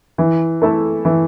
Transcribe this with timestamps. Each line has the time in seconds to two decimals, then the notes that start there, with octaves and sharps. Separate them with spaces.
0.18 E3
0.62 A3 E4 A4
1.05 E3